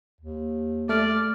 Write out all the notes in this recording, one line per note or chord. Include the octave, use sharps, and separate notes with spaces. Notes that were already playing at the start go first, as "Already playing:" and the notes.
D#2
A3 D5 F6